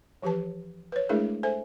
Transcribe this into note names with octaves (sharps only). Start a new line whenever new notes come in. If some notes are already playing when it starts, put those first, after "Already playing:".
E3 F3 G4 B4 A5
B4 C#5
G#3 A3 D4 E4 G#4 A#4
A4 C5 E5 G#5